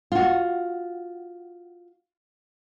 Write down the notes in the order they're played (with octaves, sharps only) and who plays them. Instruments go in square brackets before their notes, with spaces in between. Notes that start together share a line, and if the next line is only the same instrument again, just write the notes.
[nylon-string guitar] F4 F#4